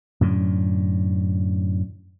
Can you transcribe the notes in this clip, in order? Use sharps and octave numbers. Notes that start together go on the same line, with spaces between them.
F#2 A2 D3